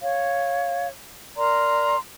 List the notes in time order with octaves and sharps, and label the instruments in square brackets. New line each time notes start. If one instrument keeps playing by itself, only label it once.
[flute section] C#5 [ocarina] F5
[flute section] A#4 A#5 C6 [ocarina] D5